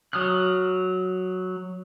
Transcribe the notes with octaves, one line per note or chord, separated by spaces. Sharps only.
F#3 D#6 F6 F#6